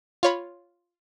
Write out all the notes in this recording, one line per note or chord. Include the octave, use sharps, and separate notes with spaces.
F4 C#5 B5